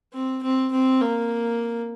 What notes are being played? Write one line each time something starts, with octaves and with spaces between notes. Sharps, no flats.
C4
C4
C4
A#3